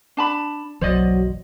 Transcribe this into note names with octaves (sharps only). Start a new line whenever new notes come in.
D4 A5 B5
F#1 B1 E3 F#3 C5 D5 D#5